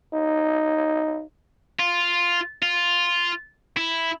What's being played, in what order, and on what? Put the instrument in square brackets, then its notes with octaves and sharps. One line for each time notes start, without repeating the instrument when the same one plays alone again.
[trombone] D#4
[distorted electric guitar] F4
F4
E4